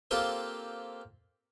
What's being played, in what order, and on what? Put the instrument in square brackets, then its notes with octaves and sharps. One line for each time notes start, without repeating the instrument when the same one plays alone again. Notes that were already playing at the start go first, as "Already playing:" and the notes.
[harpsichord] A#3 C4 F4 G4 A4 C5